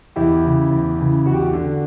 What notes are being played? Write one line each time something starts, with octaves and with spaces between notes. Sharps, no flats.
E2 E4 G4
C#3 E3
E2
C#3 E3
E2 F#4
G4
F#4
D3